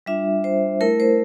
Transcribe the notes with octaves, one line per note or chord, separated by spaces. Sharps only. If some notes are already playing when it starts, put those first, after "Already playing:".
G3 D4 F4 E5
C5
A3 E4 A#4
C5